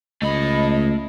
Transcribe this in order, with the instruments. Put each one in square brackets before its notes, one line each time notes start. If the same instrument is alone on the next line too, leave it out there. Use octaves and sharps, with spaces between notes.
[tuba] C#2 [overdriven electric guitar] A3 B5 [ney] D#5